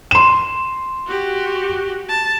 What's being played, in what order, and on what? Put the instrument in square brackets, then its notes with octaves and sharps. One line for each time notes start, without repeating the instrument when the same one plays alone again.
[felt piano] C6 E7
[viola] F#4 G4
A5